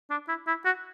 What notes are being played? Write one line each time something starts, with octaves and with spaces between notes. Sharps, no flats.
D4
E4
E4
F#4